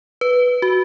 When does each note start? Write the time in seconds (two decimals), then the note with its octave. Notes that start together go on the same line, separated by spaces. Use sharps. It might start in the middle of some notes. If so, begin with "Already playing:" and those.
0.21 B4
0.62 F#4